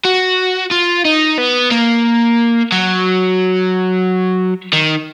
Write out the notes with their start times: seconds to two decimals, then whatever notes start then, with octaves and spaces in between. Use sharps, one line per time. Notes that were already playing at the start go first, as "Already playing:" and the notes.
0.04 F#4
0.71 F4
1.05 D#4
1.38 B3
1.72 A#3
2.72 F#3
4.73 D#3